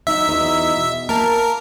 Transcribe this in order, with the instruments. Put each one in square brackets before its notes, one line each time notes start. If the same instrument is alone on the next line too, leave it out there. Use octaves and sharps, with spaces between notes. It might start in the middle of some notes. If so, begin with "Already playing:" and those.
[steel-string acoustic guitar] F#3 D#4 [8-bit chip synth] E5
[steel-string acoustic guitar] E2 D#4 F#4
B2
[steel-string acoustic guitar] A#3 A5 [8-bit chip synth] A#4